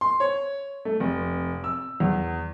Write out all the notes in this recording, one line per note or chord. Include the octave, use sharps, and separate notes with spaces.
C6
C#5
A3
F1
E6
E2